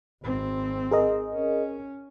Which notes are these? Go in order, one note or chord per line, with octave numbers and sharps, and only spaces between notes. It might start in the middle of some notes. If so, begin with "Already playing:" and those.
G#1 C4
G#4 A#4 D#5
C#4